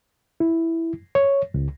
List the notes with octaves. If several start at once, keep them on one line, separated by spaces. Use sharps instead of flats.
E4
C#5
C#2